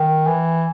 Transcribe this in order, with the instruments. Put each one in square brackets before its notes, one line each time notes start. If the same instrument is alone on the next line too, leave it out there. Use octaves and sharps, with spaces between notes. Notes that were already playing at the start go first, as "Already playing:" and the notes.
Already playing: [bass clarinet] D#3
E3